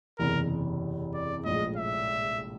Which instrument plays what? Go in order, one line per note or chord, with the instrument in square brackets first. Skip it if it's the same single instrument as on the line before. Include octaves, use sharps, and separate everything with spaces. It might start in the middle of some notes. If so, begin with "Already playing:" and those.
[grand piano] F#1 E2 C3 E3 [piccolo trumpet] A#4
[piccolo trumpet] D5
[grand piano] A#1 A2 F3 G#3 [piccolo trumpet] D#5
[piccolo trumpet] E5